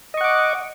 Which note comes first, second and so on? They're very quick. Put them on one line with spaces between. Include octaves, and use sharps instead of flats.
D#5 C#6 F#5 D6